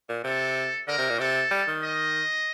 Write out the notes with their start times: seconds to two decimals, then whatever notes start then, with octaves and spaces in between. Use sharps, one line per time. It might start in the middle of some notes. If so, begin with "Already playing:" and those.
0.09 A#2
0.24 C3 A4
0.88 D3 A#4
0.99 C3
1.09 A#2
1.19 C3 A4
1.51 G3
1.68 D#3
1.83 D#5